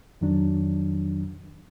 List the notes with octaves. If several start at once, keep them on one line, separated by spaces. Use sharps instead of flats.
F2 D#3 F#3 D4